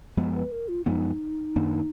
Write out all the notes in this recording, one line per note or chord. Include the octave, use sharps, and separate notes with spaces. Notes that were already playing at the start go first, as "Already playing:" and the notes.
F#2 F3 G#3 B3
B4
A#4
F4
F#2 F3 G#3 B3 D#4
F#2 D#3 A#3 D4